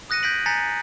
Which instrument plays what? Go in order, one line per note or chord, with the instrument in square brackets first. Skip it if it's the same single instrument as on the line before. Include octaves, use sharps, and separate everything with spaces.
[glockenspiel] D#6 F#6 A#6 C#7 D#7
G6 G#6 A#6 B6 D7 F#7
G#5 A#5 G6 A6 B6 C#7